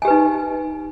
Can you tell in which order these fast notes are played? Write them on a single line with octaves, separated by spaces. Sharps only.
G#5 G4 B4 D#4